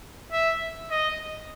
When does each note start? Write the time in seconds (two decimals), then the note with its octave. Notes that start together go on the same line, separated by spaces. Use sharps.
0.32 E5
0.91 D#5